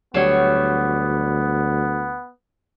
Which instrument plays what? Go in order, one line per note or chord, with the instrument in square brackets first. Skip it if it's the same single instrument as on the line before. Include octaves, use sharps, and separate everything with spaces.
[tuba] D2 [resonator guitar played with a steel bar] F#3 G3 C#5 [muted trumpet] B3